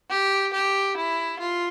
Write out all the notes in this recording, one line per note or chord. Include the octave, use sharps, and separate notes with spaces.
G4
G4
E4
F4